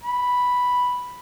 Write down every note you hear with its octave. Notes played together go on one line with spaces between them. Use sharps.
B5